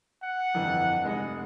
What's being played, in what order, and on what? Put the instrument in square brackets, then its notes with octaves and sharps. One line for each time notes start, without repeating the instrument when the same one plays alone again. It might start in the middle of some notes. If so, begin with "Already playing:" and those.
[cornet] F#5
[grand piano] G1 F2 E3
F1 G#3 D#5